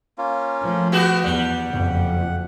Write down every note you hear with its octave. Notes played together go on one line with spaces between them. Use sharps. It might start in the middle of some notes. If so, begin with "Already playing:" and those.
A#3 C#4 F4
F3 A3
B3 F#4 G4
E2 G3 F#5
F#1 F2